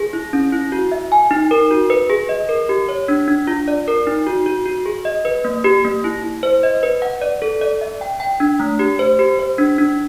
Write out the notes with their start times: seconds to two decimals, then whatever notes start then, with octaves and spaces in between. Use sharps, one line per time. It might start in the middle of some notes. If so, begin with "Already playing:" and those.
Already playing: G#4
0.13 E4
0.33 C#4
0.52 E4
0.72 F#4
0.92 E5
1.12 G#5
1.31 D#4
1.51 A#4
1.71 F#4
1.90 B4
2.10 G#4
2.29 D#5
2.49 A#4
2.69 G4
2.89 C#5
3.08 D4
3.28 D4
3.47 F4
3.68 D5
3.88 A#4
4.07 D#4
4.27 F#4
4.46 F#4
4.66 F#4
4.86 G#4
5.05 D#5
5.25 B4
5.45 A#3
5.64 G4
5.85 A#3
6.04 E4
6.24 E4
6.43 C5
6.63 D#5
6.83 B4
7.02 F#5
7.21 D5
7.42 A4
7.61 D5
7.81 E5
8.01 G5
8.20 G5
8.40 D4
8.60 A3
8.79 G4
8.99 C5
9.19 G4
9.39 C5
9.58 D4
9.78 D4